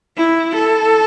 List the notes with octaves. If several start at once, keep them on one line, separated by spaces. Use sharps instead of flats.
E4
A4